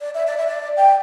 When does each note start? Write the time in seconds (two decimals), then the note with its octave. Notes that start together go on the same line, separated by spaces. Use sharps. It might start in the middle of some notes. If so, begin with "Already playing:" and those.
0.01 D5
0.14 E5
0.27 D5
0.37 E5
0.47 D5
0.77 G5